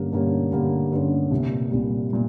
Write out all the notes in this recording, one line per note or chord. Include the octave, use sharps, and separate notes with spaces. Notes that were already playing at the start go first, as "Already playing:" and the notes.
Already playing: G2 D3 G3 A#3 C#4
G2 D3 G3 A#3 C#4
G2 D3 G3 A#3 C#4
G2 D3 G3 A#3 C#4
C2 A#2 G3
C2 A#2 G3
A#2